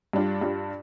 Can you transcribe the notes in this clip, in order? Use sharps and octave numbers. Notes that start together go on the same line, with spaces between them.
G2 G3 D4 F4
G2 G3 D4 F4